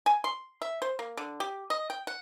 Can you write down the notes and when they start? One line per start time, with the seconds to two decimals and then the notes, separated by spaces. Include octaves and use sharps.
0.06 G#5
0.24 C6
0.62 E5
0.82 C5
0.99 A#3
1.17 D3
1.40 G4
1.70 D#5
1.90 G5
2.07 F#5